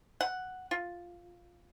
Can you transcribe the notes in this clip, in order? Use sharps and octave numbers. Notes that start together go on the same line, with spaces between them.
F#5
F4